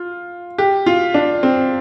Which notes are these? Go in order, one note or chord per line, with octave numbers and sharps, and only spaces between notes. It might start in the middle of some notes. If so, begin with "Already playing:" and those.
Already playing: F4
G4
F4
D4
C4